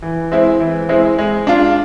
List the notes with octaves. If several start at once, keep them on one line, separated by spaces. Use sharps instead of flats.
E3
G#3 C4 E4
E3
G#3 C4 E4
G#3
D4 F4